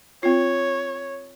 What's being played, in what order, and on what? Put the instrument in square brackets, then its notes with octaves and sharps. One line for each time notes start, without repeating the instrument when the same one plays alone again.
[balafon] C4 F4 [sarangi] C#5